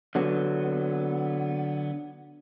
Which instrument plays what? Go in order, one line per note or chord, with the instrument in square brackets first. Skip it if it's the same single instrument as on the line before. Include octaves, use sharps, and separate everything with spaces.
[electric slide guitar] D3 F#3 B3